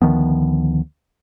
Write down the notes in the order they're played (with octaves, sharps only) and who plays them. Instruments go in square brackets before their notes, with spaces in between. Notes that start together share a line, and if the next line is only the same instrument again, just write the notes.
[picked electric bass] D2 D#3 F3 B3